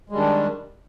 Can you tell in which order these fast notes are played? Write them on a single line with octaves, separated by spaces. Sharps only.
G#3 G3 D#3 D4